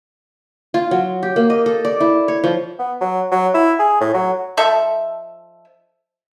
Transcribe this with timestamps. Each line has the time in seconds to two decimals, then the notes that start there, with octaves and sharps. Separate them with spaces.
0.74 F4
0.91 F#3
1.23 G4
1.36 A#3
1.50 D#5
1.66 A4
1.85 D5
2.00 E4
2.28 C#5
2.44 F3
2.79 B3
3.01 F#3
3.31 F#3
3.54 E4
3.79 G#4
4.00 A2
4.14 F#3
4.57 F3 D#4 A4 E5